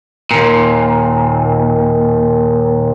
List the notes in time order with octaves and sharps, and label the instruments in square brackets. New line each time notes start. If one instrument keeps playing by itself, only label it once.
[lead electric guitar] D#2 A#2